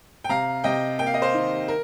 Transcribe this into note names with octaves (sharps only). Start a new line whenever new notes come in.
G5
C3 F5 A#5
C3 D#5 G5
A#3 G5
F5
D#5
C5 F5
D#3
A#4